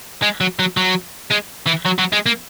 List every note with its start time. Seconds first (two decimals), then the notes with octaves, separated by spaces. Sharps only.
0.23 G#3
0.41 F#3
0.59 F#3
0.77 F#3
1.31 G#3
1.67 E3
1.86 F#3
1.99 F#3
2.13 G#3
2.26 A#3